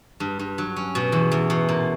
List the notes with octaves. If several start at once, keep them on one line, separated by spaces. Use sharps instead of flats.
G2
G2
F#3
C#4
B2
E2
E2
B2
A#2